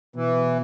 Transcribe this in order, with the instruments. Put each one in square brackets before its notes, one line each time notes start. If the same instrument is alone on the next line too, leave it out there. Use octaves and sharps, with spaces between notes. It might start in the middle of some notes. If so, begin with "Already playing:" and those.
[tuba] B2 [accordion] E3